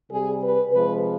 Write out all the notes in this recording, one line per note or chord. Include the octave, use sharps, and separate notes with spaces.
C3 G3 G#4
B4
C3 F3 G#3 B4